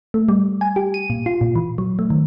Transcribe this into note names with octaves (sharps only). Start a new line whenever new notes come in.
A3
G3
G#5
G4
D#7
A#2
F4
A#2
E3
F#3
A3
D#3